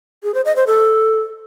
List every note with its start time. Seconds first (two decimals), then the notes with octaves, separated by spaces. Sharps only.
0.24 G#4
0.34 C5
0.45 D#5
0.56 C5
0.67 A4